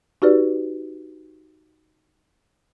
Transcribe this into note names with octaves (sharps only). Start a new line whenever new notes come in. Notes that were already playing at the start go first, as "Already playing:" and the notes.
D#4 F#4 G4 B4 D5